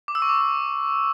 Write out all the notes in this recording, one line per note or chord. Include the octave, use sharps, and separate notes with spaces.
D6
E6
C#6
D6